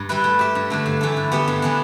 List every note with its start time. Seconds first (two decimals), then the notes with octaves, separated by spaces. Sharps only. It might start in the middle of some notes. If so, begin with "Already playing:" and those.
Already playing: G2
0.09 G3 E4 B4
0.24 A3
0.39 G4 E5
0.55 G2
0.70 D3 A3 D4
0.86 G2
1.01 E3 A3 E4 A4
1.17 D3
1.32 B3 G4 E5
1.48 G2
1.62 E3 B3 D4